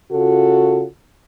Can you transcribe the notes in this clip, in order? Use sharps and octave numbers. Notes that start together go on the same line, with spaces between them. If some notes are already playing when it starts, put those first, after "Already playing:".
C#3 F4 F#4 A4